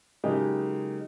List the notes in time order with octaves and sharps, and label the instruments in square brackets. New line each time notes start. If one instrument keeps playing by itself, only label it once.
[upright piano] C#3 F#3 G#3 A#3 D#4 G4